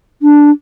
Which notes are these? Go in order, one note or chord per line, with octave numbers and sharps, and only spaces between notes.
D4